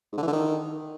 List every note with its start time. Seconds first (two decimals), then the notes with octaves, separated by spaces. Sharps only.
0.12 G#2
0.17 D3
0.22 E3
0.28 D3
0.33 D#3